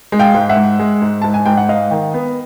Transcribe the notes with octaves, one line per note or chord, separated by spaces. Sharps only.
G#3
F5 G5
G#2
E5 F#5
G#2
G#3
G#2
G#2 A5
G#5
G#2 G5
F#5
G#2 D#5 F5
D#3
B3